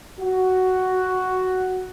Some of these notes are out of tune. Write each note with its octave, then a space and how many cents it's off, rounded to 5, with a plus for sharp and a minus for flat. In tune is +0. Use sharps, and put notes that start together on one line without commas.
F#4 +5